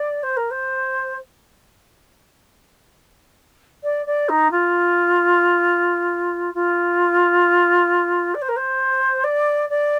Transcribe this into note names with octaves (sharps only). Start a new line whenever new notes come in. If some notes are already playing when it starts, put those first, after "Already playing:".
Already playing: D5
C5
A#4
C5
D5
D5
D#4
F4
F4
D5
C5
A#4
C5
D5
D5